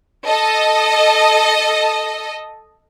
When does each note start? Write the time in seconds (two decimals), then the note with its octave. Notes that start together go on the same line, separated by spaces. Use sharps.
0.27 A4 D#5